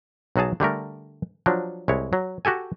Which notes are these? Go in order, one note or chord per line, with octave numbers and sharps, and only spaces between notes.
B1 F#3 F#4 G#4 A5
D3 G3 A3 A#4
F3 F#3 D4
C2 G#3 E4 C#5
F#3
F#4 G4 A4 G#5